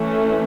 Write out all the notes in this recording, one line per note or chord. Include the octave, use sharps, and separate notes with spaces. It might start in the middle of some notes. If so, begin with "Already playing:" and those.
Already playing: E3 A3 C#4